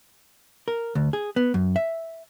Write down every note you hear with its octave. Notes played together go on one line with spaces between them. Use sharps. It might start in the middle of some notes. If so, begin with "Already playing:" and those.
A#4
D2
G#4
B3
F#2
E5